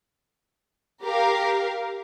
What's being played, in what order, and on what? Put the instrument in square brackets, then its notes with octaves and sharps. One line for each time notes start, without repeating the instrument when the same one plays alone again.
[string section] G4 A#4 F5